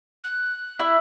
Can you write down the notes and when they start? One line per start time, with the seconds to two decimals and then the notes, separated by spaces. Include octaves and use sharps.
0.24 F#6
0.79 E4 D5 E5